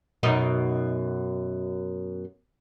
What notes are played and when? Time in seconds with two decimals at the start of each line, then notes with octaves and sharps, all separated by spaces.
0.23 F#2 B2 D#4